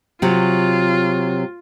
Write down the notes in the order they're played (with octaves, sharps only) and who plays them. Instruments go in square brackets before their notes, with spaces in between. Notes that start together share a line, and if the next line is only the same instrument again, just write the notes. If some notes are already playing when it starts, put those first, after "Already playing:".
[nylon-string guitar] C3 F#3 [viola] F4